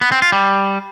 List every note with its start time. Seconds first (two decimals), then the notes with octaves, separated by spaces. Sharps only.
0.01 B3
0.12 C4
0.22 F4
0.32 G3